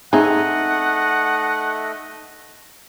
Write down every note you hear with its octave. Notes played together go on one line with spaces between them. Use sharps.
A3 C4 D#4 G#4 D#5 E5 F#5